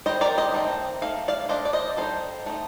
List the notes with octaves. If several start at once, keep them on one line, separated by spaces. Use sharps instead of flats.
D#3 G3 C4 C5 D#5
A#4 D5
C5 D#5
D#3 A3 C4
A3 D#4 F5
D5 F5
A3 D4 C5 D#5
D5
C5 D#5
G3 C4 D#4 A4 C5
A3 C4 D#4